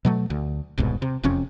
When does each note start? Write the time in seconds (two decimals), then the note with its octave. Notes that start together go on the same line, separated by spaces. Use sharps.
0.05 B2 F#3 A3
0.30 D2
0.78 D#1 C2 G#2 B2
1.02 C3
1.23 E1 F2 C3 C#4